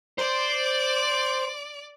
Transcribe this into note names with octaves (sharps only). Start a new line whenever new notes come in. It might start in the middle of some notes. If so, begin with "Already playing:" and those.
C5 D5 D6